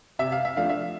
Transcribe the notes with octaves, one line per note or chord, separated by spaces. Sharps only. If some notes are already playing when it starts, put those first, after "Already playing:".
C3 E5
F5
E5
F3 A3 D4 F5
E5